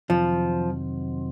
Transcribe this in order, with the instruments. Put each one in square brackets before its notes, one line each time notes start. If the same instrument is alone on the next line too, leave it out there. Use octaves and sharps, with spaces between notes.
[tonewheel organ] F2 C3 D#3 F#3 C4 [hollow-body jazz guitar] F3